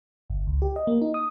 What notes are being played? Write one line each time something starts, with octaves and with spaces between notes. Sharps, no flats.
G1
C#2
G4
D#5
A#3
D#4
D#6